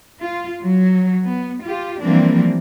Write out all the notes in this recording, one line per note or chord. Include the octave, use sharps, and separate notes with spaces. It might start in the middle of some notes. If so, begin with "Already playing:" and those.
F4
F#3
B3
F4 G4
E3 F3 G3 A#3 C4 D4